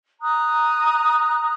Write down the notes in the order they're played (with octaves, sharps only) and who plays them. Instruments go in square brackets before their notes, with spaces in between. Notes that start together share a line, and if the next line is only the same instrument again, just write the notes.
[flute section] A#5 D#6 F#6